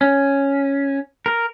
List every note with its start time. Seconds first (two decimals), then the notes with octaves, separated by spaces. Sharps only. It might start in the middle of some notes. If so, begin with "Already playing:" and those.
0.01 C#4
1.26 A#4